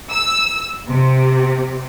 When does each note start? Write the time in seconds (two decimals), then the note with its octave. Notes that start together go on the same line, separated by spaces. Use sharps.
0.12 E6
0.88 C3